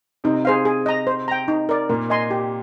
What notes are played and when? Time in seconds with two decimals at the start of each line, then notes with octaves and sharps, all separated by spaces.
0.24 C3 C4 D#4
0.45 G#4 C5 F5
0.65 G#4
0.86 D#5 A#5
1.07 C5
1.28 G5 A#5
1.48 D#4
1.69 A#4 D5
1.89 A#2 A#3 A#4
2.10 D#5 G#5 C6
2.31 G4